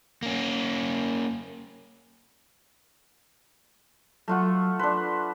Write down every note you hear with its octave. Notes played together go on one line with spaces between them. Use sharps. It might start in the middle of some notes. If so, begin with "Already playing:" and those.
A#3 C#4
F#3 A3 F4 F#5
D4 B4 C6